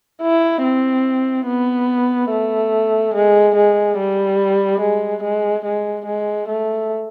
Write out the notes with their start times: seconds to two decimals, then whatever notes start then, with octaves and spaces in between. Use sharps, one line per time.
0.22 E4
0.63 C4
1.46 B3
2.30 A3
3.14 G#3
3.55 G#3
3.98 G3
4.81 G#3
5.23 G#3
5.65 G#3
6.06 G#3
6.48 A3